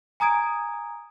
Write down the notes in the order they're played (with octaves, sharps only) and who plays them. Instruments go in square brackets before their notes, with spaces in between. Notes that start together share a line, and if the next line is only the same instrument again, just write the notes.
[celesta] G#5 A#5 D#6 G#6 D7